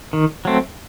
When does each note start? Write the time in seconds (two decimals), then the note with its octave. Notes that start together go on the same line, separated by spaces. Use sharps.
0.13 D#3
0.45 F#3 A3 C4